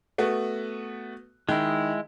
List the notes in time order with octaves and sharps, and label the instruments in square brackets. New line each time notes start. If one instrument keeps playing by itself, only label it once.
[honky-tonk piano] A3 B3 F#4
[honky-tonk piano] D#3 [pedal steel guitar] G#3 E4